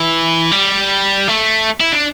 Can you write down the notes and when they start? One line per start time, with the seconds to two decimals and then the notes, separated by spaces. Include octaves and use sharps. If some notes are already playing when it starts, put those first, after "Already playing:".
Already playing: E3
0.52 G3
1.28 A3
1.81 E4
1.92 D4